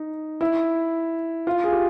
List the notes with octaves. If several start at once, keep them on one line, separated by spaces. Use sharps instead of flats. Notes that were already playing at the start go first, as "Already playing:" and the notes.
Already playing: D#4
E4
F4
G#4
G4